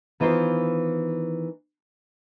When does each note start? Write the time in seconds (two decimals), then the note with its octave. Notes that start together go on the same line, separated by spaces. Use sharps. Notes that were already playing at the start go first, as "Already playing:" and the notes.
0.20 D#3 E3 B3 F4 C5